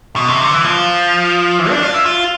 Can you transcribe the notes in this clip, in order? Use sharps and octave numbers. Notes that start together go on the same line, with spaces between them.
B2
C3
D3
E3
F3
E3
D4
F4
E4
F4